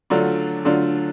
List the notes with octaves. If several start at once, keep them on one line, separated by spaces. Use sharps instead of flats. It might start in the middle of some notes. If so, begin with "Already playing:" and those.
D3 F#3 A3 D4 F4
D3 F#3 A3 D4 F4